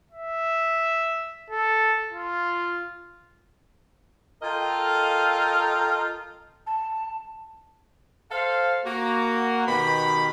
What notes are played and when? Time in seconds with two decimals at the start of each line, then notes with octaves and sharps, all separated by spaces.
0.11 E5
1.50 A4
2.13 F4
4.42 F4 A4 A#4 D#5 F5 G5
6.67 A5
8.32 A4 C5 F5
8.85 A#3 F#4
9.67 B2 D#3 B3 G4 B5